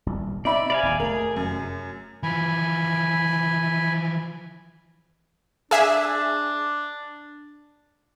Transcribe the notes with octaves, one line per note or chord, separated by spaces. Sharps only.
D#1 C2
C4 D#4 D5 E5 B5
C3 D5 F5 G#5
D1 D#2
F1 C3 A3 G#4 A#4
F#2
E3 F3 G#5 B5
D4 G#4 E5